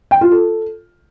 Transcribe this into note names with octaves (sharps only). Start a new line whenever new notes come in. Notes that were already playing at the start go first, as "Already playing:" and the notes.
G5
F4
A4